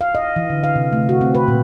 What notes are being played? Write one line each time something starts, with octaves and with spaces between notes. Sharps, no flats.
F5
D#5
E3
D3
F5
C3
A3
F#4
C4
B4
A#2